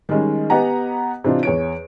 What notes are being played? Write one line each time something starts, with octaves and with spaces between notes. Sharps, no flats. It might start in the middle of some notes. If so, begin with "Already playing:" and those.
D#3 G3 G#3 C#4
B3 G4 D#5 F#5 G#5 A#5
C3 E3 D4 D#4 F4
E2 C#5 D7